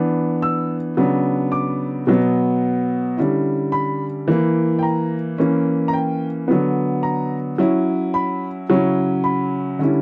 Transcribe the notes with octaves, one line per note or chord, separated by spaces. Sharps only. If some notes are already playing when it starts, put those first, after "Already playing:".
Already playing: E3 B3 D4
E6
C#3 F#3 B3 D4
D6
B2 F#3 B3
D3 G3 C#4 E4
B5
E3 A#3 E4
G5
A#5
E3 A#3 C#4
A#5
G5
D3 F#3 B3
A#5
F#3 C#4 E4
B5
C#3 F#3 C#4 E4
B5
D3 G3 C#4 E4